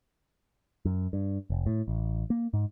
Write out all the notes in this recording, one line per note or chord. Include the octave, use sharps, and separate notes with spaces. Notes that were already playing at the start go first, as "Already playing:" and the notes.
F#2
G2
F1
A2
A1
A#3
G#2